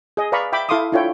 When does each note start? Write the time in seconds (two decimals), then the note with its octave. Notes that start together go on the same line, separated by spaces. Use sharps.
0.17 G#4 D#5
0.32 B4 D5 F5 A#5 B5 C#6
0.52 E5 G5 B5 D6
0.69 E4 A4 F5 C6 D6 D#6
0.92 D4 E4 F4 A4 C#5 G5